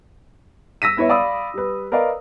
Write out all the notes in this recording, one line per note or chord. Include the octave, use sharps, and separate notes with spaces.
E6 A#6 B6 D#7
B3 E4 B4 C#5 E5
D5 F5 B5 D#6 E6
G3 B4
A#4 B4 D5 D#5 F5